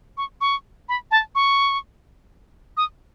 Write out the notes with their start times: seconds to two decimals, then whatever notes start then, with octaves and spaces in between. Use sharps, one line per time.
0.17 C#6
0.41 C#6
0.89 B5
1.11 A5
1.35 C#6
2.77 D#6